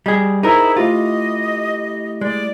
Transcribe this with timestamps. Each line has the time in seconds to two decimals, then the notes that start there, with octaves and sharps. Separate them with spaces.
0.06 G3 G#4 D#5
0.43 D#4 E4 G#4 A#4 C5 E5
0.77 A3 E4 F4 G4 D#5
2.21 G#3 D5